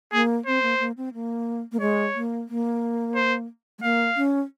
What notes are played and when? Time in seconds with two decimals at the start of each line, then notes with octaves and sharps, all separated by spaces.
0.13 A#3 G#4
0.46 C4 C5
0.63 A#3
0.80 A#3
0.97 C4
1.14 A#3
1.72 A#3
1.80 G#3 C#5
2.15 A#3
2.49 A#3
3.15 C5
3.79 G#3
3.83 A#3 F5
4.17 C#4